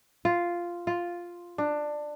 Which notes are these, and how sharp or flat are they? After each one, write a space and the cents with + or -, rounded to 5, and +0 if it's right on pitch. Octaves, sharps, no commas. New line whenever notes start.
F4 -5
F4 +0
D4 +15